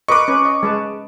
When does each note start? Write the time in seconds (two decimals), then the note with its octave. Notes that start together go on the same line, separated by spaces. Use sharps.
0.08 A#4 B4 D#5 C#6 D6
0.28 C#4 B4
0.45 D#5
0.63 G#3 B4 A5